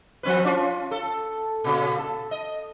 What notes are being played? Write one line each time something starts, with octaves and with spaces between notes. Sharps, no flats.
F3 C4 B4
C#4 F4
A4
A#2 C#3
A4
D#5